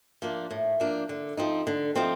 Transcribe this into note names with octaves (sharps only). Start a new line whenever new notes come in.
F3 A#3 D4
A2
F3 A#3 D4
D3
F3 C4 D#4
D3
F3 C4 D#4